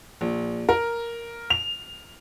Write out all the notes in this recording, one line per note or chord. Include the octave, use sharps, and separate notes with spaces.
A#1
A#4
F7